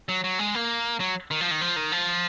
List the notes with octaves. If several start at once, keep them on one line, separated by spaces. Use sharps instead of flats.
F#3
F#3
G#3
A#3
F#3
D#3
F3
D#3
F3
D#3
F3